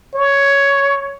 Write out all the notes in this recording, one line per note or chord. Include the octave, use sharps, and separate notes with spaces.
C#5